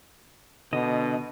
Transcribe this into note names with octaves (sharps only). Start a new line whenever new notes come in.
B2 D3 D#5